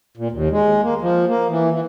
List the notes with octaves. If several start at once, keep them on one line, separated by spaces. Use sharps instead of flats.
A#2
D#2
G#3
A#3
F3
A#3
E3
E3